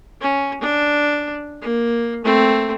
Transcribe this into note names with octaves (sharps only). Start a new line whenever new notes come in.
C#4
D4
A#3
A3 C4